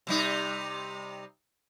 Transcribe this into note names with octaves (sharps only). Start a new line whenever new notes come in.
C3 G3 D#4